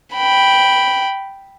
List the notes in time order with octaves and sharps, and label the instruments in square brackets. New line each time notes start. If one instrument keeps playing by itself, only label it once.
[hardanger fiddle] G5 B5